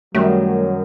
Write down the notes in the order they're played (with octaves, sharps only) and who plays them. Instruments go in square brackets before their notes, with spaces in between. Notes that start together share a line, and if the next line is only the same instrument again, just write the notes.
[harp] F#2 D#3 G3 [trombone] F#3 [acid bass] A3